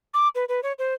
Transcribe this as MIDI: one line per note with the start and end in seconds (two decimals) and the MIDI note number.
0.14 0.28 86
0.35 0.45 71
0.49 0.60 71
0.63 0.73 73
0.79 0.94 72